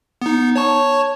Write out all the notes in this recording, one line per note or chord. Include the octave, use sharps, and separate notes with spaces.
B3 D#4
C#5 A5 C#6